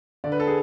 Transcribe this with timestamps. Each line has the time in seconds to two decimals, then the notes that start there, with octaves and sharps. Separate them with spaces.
0.24 D3 D5
0.32 B4
0.40 A4
0.47 G#4